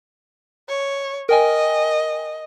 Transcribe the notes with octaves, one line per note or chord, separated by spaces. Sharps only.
C#5
A#4 D#5 G5 G#5